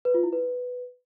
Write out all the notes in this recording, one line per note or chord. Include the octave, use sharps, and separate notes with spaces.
B4
F4
E4
B4